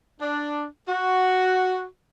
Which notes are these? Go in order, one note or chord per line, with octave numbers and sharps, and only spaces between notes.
D4
F#4